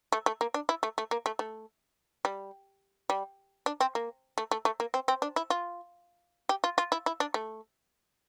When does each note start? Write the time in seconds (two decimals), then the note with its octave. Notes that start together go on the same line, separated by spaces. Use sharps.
0.12 A3
0.26 A3
0.41 A#3
0.54 D4
0.69 E4
0.83 A3
0.98 A3
1.11 A#3
1.26 A3
1.39 A3
2.25 G3
3.10 G3
3.66 D4
3.80 C4
3.95 A#3
4.38 A3
4.51 A3
4.65 A3
4.80 A#3
4.94 C4
5.08 C4
5.22 D4
5.36 E4
5.50 F4
6.49 G4
6.64 F4
6.78 F4
6.92 E4
7.06 E4
7.20 D4
7.34 A3